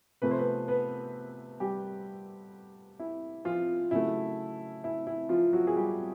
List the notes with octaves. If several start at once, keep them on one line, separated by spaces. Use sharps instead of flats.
C3 F3 A3 B4
C5
B3 B4
B3 B4
G3 G4
E4
F3 F4
C#3 F#3 A3 E4
E4
E4
F3 F4
F#3 F#4
G#4
G3 G4